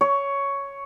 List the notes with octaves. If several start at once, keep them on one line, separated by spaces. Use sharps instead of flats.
C#5